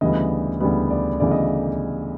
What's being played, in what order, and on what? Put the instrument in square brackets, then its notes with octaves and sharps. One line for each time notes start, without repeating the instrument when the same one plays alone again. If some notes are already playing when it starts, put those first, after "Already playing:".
[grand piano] D2 C#3 E3 G3 B3 D#5
D2 C#3 E3 G3 B3
D5
D2 C#3 E3 G3 B3 D5
D#5